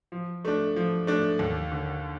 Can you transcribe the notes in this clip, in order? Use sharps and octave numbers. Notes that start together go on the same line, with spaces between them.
F3
A3 D4
F3
A3 D4
D#2
D3